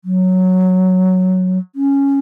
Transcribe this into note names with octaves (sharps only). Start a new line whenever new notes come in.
F#3
C#4